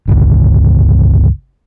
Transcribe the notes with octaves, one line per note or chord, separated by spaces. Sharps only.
G1 C#2